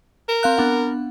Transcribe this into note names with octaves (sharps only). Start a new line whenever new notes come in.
A#4 E7
C4 F5 F#6
B3 D4 F#5